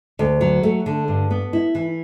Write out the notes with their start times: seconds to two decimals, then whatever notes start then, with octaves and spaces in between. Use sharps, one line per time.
0.19 D2
0.41 F#3
0.63 A3
0.86 D3
1.08 G2
1.31 B3
1.53 E4
1.75 E3